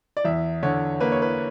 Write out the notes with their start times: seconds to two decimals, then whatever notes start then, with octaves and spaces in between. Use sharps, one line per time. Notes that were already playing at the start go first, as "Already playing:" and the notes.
0.17 D5
0.25 E2 E5
0.63 D3 C#5
1.00 A#3 B4
1.12 C#5
1.22 B4